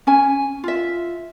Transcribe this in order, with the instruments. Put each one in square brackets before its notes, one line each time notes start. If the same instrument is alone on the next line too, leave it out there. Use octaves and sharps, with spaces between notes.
[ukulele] C#4 G#5
F4 E5